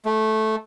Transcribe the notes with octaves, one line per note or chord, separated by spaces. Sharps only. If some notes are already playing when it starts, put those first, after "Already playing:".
A3